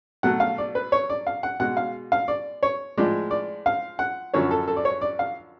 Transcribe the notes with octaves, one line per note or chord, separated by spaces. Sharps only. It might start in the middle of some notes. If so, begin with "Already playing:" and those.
B2 F#3 A3 F#5
F5
D5
B4
C#5
D5
F5
F#5
B2 G#3 F#5
F5
F5
D5
C#5
A2 F3 G#3 D5
D5
F5
F#5
F#2 D3 F3 C#5
A4
A4
D5
C#5
D5
F5